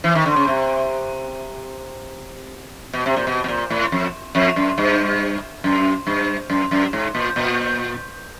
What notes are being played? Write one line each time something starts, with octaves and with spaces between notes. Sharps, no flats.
E3
D#3
D3
C#3
C3
B2
C3
A#2
B2
B2
A#2
A2
F2
F2
F#2
G2
F#2
G2
F#2
F#2
G#2
A#2
A#2